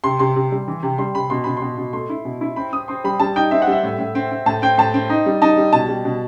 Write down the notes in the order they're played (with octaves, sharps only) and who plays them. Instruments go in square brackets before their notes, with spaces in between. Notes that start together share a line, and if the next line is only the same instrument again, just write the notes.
[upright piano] C3 [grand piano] C6
[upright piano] C3 [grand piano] C6
[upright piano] C3
G3
E3
C3
[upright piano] G3 [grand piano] C6
[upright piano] C3 [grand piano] B5
[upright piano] B2 [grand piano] C6
[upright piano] B2 [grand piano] B5
[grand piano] C6
[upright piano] B2
B2
[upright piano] A3 [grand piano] C6
[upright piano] E4
B2
E4
[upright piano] C4 [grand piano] B5
[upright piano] C4 [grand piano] D#6
[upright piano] C4 [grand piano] C6
[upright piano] G3 [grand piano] B5
[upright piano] G3 [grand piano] A5
[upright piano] D#4 [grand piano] G5
[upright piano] C4 [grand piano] E5
[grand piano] F#5
[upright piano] G3
[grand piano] E5
[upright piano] A2
A2
C4
C4
[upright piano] A2 [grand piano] A5
[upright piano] C4 [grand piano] G5
[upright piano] A2 [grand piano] A5
[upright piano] C4
D#4
G3
[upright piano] D#4 [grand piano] A5
[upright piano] G3
[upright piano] B2 [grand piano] A5
[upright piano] G3
B2